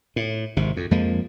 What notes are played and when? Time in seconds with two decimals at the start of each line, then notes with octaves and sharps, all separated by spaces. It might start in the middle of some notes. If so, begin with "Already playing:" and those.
0.16 A2
0.57 G#1 C3
0.77 F2
0.91 F2 F3 G#3 A#3